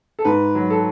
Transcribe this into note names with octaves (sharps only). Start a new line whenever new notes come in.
A4
G#2 B4
F#3
A4